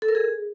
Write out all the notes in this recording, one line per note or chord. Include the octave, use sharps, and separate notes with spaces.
A4
A#4
G#4